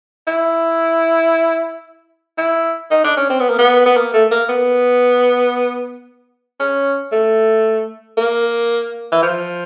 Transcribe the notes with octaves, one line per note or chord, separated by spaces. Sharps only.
E4
E4
D#4
D4
C#4
C4
B3
A#3
B3
B3
A#3
A3
A#3
B3
C#4
A3
A#3
E3
F3